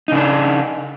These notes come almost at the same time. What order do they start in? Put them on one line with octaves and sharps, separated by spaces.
D#4 C#3 D4